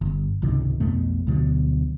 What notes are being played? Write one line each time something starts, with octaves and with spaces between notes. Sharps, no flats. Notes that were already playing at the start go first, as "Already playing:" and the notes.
G1
G#1 C#2 C3 D#3
B1 F2 B2 A3
D2 B2 D3 F#3